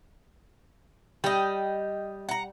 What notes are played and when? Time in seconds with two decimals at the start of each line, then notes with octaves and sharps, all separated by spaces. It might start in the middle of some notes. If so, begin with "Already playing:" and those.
1.24 G3 D#5 G5
2.29 F#5 A#5